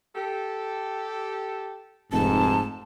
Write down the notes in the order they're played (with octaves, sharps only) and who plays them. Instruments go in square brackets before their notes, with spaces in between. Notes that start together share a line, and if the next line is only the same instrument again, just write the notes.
[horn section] G4 A4
[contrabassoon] F1 [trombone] G#2 [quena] A5